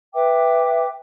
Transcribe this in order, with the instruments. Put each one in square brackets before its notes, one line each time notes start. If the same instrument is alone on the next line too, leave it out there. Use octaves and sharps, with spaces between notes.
[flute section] B4 E5 G5 D6